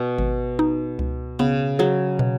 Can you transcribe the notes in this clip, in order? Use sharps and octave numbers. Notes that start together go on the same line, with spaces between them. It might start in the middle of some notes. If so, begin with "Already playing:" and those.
Already playing: B2
G#1
D#4
C#2
C#3 B3
F#3 G#4
B2